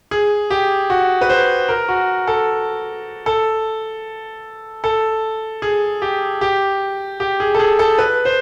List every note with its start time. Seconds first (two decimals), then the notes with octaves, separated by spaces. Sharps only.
0.11 G#4
0.50 G4
0.90 F#4
1.21 B4
1.29 C5
1.68 A#4
1.88 F#4
2.27 A4
3.26 A4
4.84 A4
5.62 G#4
6.02 G4
6.41 G4
7.20 G4
7.40 G#4
7.55 A4
7.59 G#4
7.79 A4
7.98 B4
8.25 C5